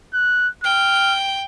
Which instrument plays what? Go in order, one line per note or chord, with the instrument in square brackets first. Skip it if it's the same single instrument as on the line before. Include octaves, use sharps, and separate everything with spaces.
[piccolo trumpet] F#6
[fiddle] G5 [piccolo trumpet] F6